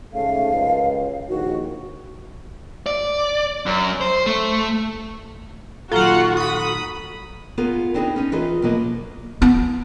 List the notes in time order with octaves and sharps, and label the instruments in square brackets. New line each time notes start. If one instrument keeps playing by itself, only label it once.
[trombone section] G#2 C#3 A3 [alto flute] F5
[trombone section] C#2 F#2
[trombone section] A#1 D#2 D#3 [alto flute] F#4
[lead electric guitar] D5
F#2
C5
A3
[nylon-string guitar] A#2 D#3 F#3 [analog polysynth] F4 F#5 [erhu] F#4 [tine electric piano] A4 A#5
[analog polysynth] B5 D#6
[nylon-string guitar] B3 F4 G#4 A#4
B3 C4 D4 D#4 G#4 B4
C#4 D#4
E3 F4 G#4 A#4 B4 D#5
B2 F3 F#3 A#3 D#5
[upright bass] B3